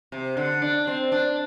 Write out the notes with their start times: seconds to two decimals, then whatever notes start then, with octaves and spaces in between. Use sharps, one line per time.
0.12 C3
0.37 D3
0.62 D4
0.87 C4
1.12 D4